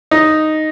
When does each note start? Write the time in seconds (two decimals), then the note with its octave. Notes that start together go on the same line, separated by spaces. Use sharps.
0.11 D#4